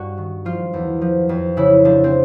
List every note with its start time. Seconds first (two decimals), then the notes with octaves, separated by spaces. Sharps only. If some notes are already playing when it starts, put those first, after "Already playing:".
Already playing: G2 F#4
0.18 D#3
0.45 F3 F4
0.74 E2
1.01 F3
1.29 F2
1.57 C#3 E4
1.85 F3 D4
2.04 C4